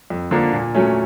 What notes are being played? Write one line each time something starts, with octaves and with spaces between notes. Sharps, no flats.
F2
D3 F3 A#3 D4
A#2
F#3 A3 C#4